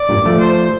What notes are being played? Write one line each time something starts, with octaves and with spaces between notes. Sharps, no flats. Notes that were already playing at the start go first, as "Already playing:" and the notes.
Already playing: D5
G2 A#2
F3 A3
C5